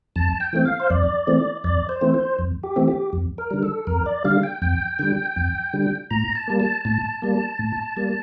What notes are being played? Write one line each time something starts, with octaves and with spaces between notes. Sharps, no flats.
F2 A5
G5
E3 A3 C4
F5
C5
F2 D5
E3 A3 C4
F2 D5
C5
E3 A3 C4
C5
F2
G4
E3 A3 C4
G4
F2
A#4
D3 G3
A4
F2 A#4
D5
D3 G3 F5
G5
F2 G5
D3 G3
F2
D3 G3
A2 A#5
A5
G3 A#3
A5
A2 A5
G3 A#3
A2
G3 A#3